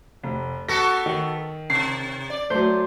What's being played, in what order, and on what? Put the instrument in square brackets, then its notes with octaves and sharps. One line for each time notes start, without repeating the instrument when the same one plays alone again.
[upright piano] F1
[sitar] B3 F#4 A4 [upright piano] A#6
[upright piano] D#3
[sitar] C3 [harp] C7
[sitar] D5
[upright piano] F#3 A3 [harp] C5